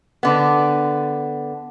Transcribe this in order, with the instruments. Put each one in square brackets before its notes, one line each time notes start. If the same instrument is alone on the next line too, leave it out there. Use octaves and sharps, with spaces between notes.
[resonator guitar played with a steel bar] D3 B3